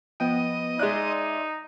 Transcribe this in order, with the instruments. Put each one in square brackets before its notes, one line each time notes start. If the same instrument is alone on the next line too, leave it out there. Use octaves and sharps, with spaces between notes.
[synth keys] F3 B3 [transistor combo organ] D#5 [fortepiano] G5
[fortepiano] G#3 F#6 [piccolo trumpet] D#4 [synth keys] D5 E5 C6